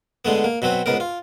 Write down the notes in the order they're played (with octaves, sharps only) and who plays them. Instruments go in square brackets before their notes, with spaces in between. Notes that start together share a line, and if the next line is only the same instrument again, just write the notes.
[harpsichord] D3 G#3 A3 B3
A#3
B2 F#3 C4 B4
C#2 G#2 B3 A#4
F4